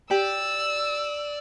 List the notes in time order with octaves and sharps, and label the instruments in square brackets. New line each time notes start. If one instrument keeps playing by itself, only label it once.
[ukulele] G4 [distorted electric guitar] D5 [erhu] E6